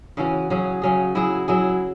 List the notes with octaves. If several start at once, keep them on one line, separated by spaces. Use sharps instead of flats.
C#3 E3 C#4 F#4
C#3 F#3 C#4 G#4
C#3 F#3 C#4 G#4
F#3 E4 G#4
F#3 E4 G#4